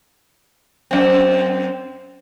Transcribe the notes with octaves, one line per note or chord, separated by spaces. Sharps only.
F#2 C4